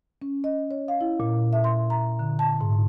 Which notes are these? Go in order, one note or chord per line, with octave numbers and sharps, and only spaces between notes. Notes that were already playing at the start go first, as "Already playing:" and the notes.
C#4
D#5
C#5
F5
E4
A#2
E5
C6
A#5
D3
A5
G#2